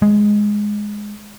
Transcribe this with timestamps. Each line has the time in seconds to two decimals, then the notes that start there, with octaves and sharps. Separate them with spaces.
0.02 G#3